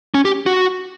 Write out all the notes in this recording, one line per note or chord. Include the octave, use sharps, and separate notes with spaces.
C#4
G4
F#4